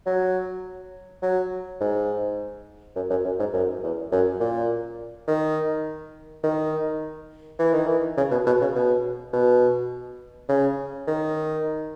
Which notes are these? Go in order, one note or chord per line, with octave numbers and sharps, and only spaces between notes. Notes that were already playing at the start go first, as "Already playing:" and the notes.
F#3
F#3
G#2
F#2
F#2
F#2
G#2
F#2
E2
F#2
A#2
D#3
D#3
E3
D#3
E3
C#3
B2
B2
C#3
B2
B2
C#3
D#3